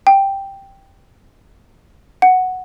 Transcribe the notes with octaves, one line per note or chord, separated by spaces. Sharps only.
G5
F#5